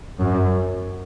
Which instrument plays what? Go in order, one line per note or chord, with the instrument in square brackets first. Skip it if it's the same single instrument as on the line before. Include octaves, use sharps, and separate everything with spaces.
[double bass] F#2